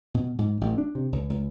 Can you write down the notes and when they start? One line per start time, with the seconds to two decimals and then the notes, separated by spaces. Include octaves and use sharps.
0.14 B2
0.38 G#2
0.61 A1
0.78 D4
0.95 C3
1.12 C#2
1.30 C#2